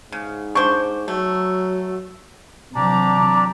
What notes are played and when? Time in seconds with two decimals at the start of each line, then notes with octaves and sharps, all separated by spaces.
0.12 G#2 C#3
0.55 D4 C5 C#6
1.08 F#3 A3
2.75 C3 E3 F#3 D4 G4 D5 A#5